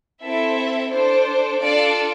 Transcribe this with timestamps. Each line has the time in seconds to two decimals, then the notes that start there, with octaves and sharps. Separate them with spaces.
0.22 C4 E4 A4 E5
0.92 D4 A4 C5
1.61 D4 F4 A4 D5